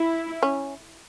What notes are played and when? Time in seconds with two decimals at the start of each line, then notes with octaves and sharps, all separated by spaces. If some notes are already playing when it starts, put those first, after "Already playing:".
Already playing: E4
0.43 C#4